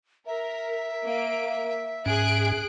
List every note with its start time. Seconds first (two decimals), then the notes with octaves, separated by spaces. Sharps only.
0.27 A#4 E5
1.04 A#3 D7
2.06 G#2 C#4 G#4 F#6 D7